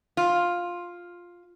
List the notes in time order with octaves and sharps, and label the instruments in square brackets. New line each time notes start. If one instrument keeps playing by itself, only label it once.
[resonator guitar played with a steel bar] F4